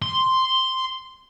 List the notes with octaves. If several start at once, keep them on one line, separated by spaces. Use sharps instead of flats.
C6